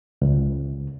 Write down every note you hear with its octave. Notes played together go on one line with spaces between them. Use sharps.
C#2